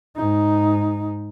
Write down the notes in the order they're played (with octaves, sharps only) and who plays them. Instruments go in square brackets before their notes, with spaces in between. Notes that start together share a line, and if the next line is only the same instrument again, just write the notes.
[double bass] G#2 D#4